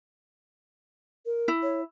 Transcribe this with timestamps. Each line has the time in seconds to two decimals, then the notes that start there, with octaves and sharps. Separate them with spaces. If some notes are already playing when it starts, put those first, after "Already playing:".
1.26 A#4
1.48 E4
1.62 C#5